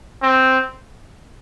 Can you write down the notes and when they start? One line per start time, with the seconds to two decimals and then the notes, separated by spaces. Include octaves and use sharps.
0.22 C4